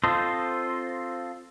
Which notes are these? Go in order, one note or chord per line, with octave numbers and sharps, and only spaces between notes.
C4 F4 A4 C5 D#5